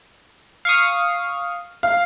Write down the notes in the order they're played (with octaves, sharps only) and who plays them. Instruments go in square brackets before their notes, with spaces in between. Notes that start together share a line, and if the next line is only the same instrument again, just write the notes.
[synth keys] F5 C#6 D#6
[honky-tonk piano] F5